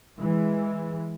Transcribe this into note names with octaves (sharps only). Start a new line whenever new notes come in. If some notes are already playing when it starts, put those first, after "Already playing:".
E3 G#3